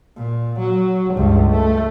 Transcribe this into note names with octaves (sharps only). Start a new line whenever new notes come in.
A#2
F#3
C#2 G2
A3